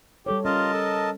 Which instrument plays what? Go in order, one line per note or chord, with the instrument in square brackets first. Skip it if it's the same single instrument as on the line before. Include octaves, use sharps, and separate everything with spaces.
[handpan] G3 A4 C#5 [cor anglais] G4
[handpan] C#4 [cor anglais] F4 [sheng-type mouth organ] A#4 D#5 A5
[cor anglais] A4